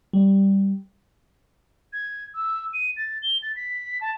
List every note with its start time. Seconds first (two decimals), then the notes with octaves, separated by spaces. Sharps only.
0.13 G3
1.93 G#6
2.34 E6
2.73 D#7
2.97 A6
3.22 G7
3.43 A6
3.56 B6
4.01 A5